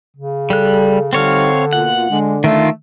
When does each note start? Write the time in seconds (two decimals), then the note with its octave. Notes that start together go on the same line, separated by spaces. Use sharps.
0.17 C#3
0.50 G3 A4 F#6
1.13 D3 G3 C4 D#4 C#5 F5
1.73 B2 A#3 F4 F#5
2.10 D3 G#3 D4
2.44 D#3 A3 F4